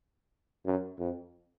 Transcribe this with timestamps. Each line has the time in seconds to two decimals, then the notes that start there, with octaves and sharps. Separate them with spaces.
0.66 F#2
0.99 F2